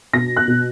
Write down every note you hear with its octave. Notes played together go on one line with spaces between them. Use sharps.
B2 A#6
F#6
B2